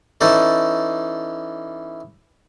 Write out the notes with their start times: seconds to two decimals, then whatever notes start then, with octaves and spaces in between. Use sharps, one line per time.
0.21 E3 C#4 D#4 A4 D5